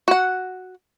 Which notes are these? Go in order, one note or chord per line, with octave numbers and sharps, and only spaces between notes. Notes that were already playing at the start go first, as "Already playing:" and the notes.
F#4 F#5